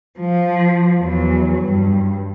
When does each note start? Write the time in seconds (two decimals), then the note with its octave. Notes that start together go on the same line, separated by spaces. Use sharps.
0.19 F3
1.00 E2 F#3
1.61 G2